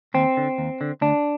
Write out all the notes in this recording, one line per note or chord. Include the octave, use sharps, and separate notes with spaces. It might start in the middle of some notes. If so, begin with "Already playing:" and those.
D#2 C4
D3
D#2
D3
D2 D4